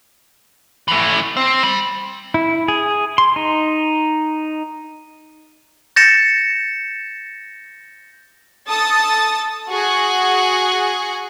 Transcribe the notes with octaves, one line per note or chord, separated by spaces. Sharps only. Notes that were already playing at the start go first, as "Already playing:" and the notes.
E3 A3
C4
G3
E4
G#4
C6
D#4
G6 A6 A#6 C#7 E7
A4 A5 D#6 A6
F#4 G#4 F#5 G#5